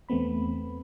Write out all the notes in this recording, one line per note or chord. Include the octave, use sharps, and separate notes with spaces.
E2 A3 B3 C4 B5